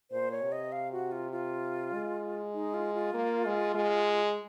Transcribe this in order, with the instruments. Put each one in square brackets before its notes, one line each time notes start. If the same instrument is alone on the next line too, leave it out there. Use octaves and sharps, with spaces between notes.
[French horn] A#2 [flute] C5
[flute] C#5
[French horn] C3
[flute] D#5
F5
F#4
F4
F4
[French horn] G#3
[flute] D#4
F4
F4
[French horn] A#3
G#3
G#3